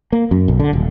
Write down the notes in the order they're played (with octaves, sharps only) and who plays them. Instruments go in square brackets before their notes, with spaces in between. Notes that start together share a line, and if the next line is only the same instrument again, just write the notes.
[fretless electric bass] A#3
F#2
B1
D3
D#1